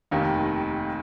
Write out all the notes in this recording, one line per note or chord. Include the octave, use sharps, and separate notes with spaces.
F1 D#2 D#3 A#3